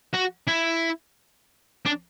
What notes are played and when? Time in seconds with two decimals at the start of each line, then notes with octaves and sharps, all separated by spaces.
0.14 F#4
0.48 E4
1.86 D4